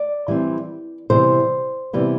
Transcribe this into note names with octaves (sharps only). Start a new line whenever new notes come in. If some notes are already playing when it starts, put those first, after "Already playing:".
Already playing: D5
E3 G3 C4
C3 E3 G3 B3 C5
C3 E3 G3 B3